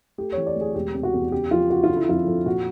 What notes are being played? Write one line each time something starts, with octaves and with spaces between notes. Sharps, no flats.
A3 G4
E3 C#5
D5
D2
G#4
E1 G4
C3
F#4
E2
C#3 G4
F3 F4
C#3 F#4
F4
D3
E4
F2 F4
F2
A#2 F#4